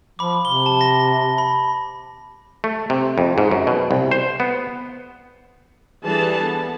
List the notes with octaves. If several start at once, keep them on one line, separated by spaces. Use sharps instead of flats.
F3 B5 D6
C3 G7
A5
B5 A#6
B5
A3
C3
F2
G#2
F#2
B2
C2
C5
B3
E3 G3 D4 G#4 A4 A5
B3